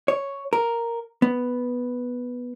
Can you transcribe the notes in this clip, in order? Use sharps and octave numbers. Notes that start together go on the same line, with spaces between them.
C#5
A#4
B3